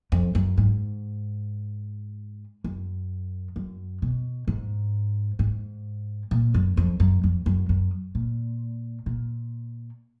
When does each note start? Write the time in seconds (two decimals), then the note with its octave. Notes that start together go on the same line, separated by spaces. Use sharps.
0.12 F2
0.35 F#2
0.57 G#2
2.64 F#2
3.56 F#2
4.02 B2
4.47 G#2
5.39 G#2
6.31 A#2
6.54 F#2
6.77 F2
7.00 F#2
7.23 F2
7.46 F#2
7.69 F#2
8.15 A#2
9.06 A#2